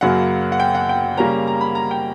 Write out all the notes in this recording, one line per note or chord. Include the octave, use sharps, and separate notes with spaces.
F#2 C#3 F#3 A#3 F#5
F#5
G5
F#5
G5
C#3 G3 A#3 C#4 A#5
A#5
B5
A#5
G5